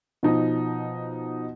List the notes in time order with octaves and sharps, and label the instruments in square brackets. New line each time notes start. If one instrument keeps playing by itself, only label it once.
[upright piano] B2 F3 D#4